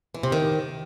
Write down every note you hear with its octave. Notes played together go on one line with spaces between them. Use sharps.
E3
C3
D#3